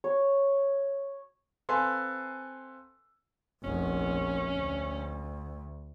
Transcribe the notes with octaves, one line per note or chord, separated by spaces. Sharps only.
C#5
C4 A4 B4 F5 G#5 C6
F1 A#1 C#4
D2